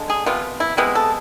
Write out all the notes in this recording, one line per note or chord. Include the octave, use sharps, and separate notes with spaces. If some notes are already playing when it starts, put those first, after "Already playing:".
Already playing: D3 G#3
G#4
C3 F3 B3 F4
E4
C3 G#3 B3 E4
A4